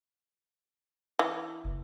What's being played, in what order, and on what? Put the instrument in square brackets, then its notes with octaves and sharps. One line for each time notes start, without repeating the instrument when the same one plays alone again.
[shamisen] E3
[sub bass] F#1